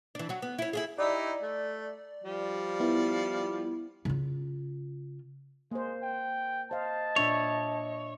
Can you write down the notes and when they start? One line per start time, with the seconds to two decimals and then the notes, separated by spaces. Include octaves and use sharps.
0.15 E3 D4
0.29 F#3 F#4
0.42 B3
0.59 C#4 E4
0.73 E4 F4 G#4
0.98 D#4 E4 G4 D5
1.42 A3
2.24 F3 G3
2.80 B3 E4
4.05 C#3 F4
5.71 G#3 A#3 C5
6.02 G5
6.71 C5 D#5 F5 A5
7.16 A#2 D4 C#5 E5